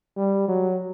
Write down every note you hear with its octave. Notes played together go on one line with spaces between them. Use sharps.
G3
F#3